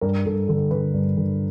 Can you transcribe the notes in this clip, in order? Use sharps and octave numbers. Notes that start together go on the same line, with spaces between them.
G2 A#4
G2 A4
D3 A4
D3 B4
G2
D3